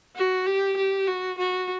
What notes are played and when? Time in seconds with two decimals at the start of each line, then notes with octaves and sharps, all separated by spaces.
0.16 F#4
0.46 G4
0.77 G4
1.07 F#4
1.38 F#4